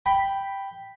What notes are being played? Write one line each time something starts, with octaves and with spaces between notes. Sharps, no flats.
G5 B5